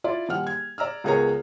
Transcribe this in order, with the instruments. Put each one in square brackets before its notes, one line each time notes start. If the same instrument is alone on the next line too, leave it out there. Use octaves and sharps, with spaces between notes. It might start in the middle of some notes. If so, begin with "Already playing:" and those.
[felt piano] E4 F4 D5
D#1 F#5 F6
G#6
D5 A#5 E6 F6
C#2 B3 G#4 A#4 C#5 A#5